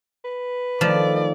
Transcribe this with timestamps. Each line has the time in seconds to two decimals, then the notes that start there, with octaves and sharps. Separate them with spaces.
0.25 B4
0.81 D#3 F3 A3 D5